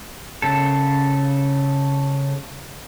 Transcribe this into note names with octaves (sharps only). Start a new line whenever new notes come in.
C#3 A4